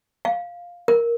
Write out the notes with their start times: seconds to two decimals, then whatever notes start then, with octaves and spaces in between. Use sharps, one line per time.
0.25 F5
0.88 A#4